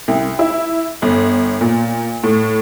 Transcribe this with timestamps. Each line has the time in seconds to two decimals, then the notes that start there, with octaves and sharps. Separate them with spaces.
0.08 C2
0.39 E4
1.02 G1
1.61 A#2
2.24 A2